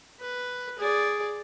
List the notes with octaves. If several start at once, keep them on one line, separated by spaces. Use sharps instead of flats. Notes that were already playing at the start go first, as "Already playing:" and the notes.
B4
G#4 D5